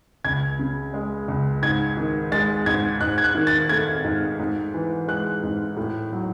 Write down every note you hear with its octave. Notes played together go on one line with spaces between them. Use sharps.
C#2 G#6
C#3
G#3
C#2
G#2 G#6
D#3
G#3 A6
G#2 G#6
G#2 F#6
G#6
F#6
D#3
A6
A3 G#6
G#2
G#2
E3
G#3 F#6
G#2
A2
F#3